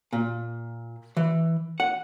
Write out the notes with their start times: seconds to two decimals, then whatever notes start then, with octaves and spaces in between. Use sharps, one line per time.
0.13 A#2
1.17 E3
1.80 F#5